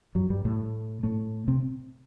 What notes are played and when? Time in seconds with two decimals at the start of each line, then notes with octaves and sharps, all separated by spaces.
0.15 F#2 F#3
0.30 G2 G3
0.45 A2 A3
1.03 A2 A3
1.48 C3 C4